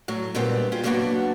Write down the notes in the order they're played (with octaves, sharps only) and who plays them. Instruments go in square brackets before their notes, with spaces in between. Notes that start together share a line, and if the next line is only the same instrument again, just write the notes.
[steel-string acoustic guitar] A2 F#3
A#2 D3 G3 G#3 B3 C4
F4 G4 G#4
F#3 G3 A#3 B3 D4 F#4